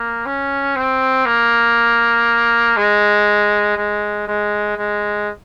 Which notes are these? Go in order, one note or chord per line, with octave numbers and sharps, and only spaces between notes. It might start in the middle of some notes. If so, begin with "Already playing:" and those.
Already playing: A#3
C#4
C4
A#3
G#3
G#3
G#3
G#3